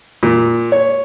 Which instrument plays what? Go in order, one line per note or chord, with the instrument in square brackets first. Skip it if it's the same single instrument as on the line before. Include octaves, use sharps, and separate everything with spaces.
[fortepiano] A#2
C#5